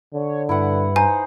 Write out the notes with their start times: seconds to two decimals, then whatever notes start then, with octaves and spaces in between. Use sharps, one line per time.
0.13 D3 C#5
0.49 G2 E4 B4 F#5
0.96 D#4 C5 G#5